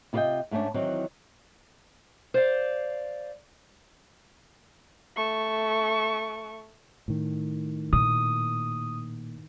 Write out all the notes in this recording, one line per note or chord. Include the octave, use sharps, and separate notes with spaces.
C3 E4 F4 C5 D#5 G5
G#2 A3 B3 C#4 D4
D#3 E3 F#3 C4
C5 D5 F5
A3 C#6
A2 D#3
A#2 D#6